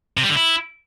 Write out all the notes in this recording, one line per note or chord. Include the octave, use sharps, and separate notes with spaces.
C3
G3
D3
E4